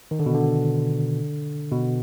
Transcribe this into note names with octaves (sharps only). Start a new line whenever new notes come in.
D#3
D3
B2
D3
B2